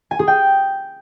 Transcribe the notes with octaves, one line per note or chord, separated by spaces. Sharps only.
G#5
G#4
G5